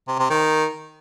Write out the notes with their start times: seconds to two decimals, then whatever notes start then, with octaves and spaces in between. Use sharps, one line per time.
0.08 C3
0.19 C3
0.30 D#3